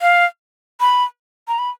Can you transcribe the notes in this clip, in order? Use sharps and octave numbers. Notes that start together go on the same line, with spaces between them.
F5
B5
A#5
B5